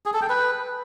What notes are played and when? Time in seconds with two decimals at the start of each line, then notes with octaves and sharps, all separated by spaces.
0.06 G#4
0.14 A4
0.22 G5
0.29 B4